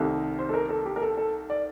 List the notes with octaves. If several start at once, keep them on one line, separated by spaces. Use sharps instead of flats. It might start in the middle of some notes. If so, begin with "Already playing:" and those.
Already playing: C2 C3 D#3 A3
C5
A4
A#4
A4
G4
A#4
A4
A4
D5